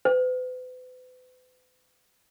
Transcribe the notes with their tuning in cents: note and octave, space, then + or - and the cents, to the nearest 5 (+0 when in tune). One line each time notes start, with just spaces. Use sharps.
B4 +45